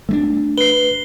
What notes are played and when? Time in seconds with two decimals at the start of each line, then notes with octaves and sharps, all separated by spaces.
0.09 A3 A#3 D4
0.58 B4 C7 G7